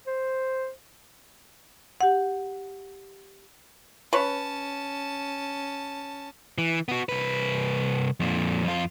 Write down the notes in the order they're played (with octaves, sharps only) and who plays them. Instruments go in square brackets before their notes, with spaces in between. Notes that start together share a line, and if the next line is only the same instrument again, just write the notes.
[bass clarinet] C5
[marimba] G4 F#5
[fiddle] C#4 A5 [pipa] B4 C#5
[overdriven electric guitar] E3
B3 F#4
C2 B4
F2 A#2
F2 F4